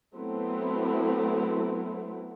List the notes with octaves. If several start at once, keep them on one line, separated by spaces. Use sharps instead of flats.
F#3 A3 B3 C4 E4